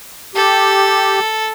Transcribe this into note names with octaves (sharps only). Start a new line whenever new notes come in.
G4 A4